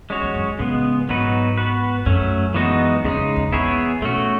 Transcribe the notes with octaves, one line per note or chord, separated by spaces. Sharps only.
G#3 C#4 F#4 C#5
E2
F#2
A2 C#3 G#3 B3
G#2 F#3 B3 D#4 F#4 B4
B3 F#4 B4
F#2 F#3 A3 C#4
E3 G#3 B3 D#4 F#4
E2 C#3 G#3 D#4
E2
E2 B3 E4 G#4 C#5
B2 A3 C#4 F#4